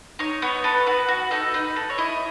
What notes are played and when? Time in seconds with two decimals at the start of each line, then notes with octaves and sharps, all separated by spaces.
0.19 D#4 C#5
0.42 B3 C#5
0.64 A4 B4
0.87 F#4 B4
1.08 F#4
1.31 D#4 A4
1.54 D#4 B4
1.76 A4
1.90 C#5
1.98 E4 D#5